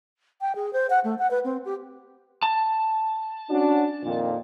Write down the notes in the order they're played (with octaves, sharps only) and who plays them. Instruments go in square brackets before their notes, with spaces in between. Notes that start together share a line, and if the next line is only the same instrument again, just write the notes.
[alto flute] G5
G#4
C5
F#5
A3
F#5
B4
C4
G4
[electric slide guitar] A5
[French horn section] C#4 D4 F#4
F2 A#2 D#3